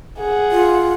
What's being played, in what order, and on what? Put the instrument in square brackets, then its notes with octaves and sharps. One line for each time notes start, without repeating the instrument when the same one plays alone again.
[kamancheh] G#4 F#5
[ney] F4